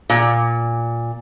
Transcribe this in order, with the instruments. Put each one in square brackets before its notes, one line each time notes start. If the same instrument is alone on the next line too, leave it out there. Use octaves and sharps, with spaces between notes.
[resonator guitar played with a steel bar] A#2